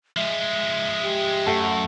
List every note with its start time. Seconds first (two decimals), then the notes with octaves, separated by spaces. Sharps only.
0.17 F3 G#3 E5
1.03 G4
1.46 F#2 A3 F#5